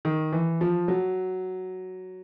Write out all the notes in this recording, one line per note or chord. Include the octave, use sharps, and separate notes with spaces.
D#3
E3
F3
F#3